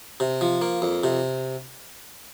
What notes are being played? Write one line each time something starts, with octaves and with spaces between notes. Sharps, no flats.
C3
F3
A#3
F2
C3